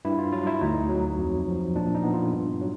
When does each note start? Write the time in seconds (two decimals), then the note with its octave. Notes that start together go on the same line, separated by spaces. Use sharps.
0.05 G2 E4
0.19 F4
0.32 F#3 F4
0.47 E4
0.61 D2 D#4
0.90 F#3
1.18 F2
1.47 F3
1.76 A#2 D4
1.95 D#4
2.03 B3
2.14 F4
2.33 G2
2.61 F#3